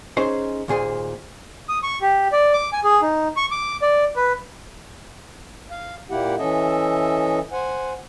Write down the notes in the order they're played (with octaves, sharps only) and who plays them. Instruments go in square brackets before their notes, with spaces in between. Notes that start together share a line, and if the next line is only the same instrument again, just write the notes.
[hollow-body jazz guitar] C#4 D#4 G#4 C5
D#2 A#2 G#4 C5 G#5
[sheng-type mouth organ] D#6
C#6
G4
D5
D6
G#5
G#4
D#4
C#6
D6
D5
B4
[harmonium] F5
A#2 A#3 E4 G4 F#5
E3 C#4 A4 D#5 E5
C5 F#5 G#5